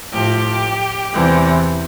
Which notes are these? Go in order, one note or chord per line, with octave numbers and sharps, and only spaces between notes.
A2 F3 G4
E2 C3 E3